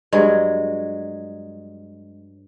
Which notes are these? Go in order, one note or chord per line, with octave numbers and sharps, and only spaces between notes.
G2 F#3 G#3